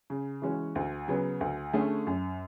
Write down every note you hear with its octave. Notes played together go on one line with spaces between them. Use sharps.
C#3
E3 G#3 C#4 F#4
D2
C#3 F#3 B3
D2
D3 A3 C#4 G#4
F#2